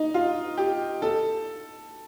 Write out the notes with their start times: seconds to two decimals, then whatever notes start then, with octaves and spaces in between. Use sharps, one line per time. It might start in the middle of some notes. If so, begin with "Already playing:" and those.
Already playing: D#4
0.14 F4
0.57 G4
1.02 A4